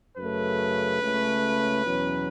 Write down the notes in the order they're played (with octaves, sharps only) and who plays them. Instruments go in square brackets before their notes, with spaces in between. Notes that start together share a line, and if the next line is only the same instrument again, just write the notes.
[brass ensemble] F#2 C#3 A3 B4
C#2 C#3 A3 C#4
E2 B2 F#3 C#4